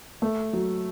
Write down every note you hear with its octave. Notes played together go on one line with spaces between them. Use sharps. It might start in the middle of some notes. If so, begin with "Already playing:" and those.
A3
F#3